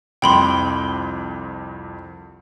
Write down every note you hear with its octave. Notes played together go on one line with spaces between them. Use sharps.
C2 F2 G5 B5 C6